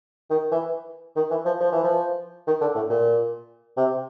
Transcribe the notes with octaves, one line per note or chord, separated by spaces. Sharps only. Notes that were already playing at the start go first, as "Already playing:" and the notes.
D#3
E3
D#3
E3
F3
F3
E3
F3
D#3
D3
A2
A#2
C3